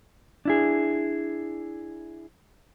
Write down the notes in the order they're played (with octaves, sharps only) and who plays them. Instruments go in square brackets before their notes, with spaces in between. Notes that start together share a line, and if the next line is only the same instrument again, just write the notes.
[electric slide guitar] D4 E4 G#4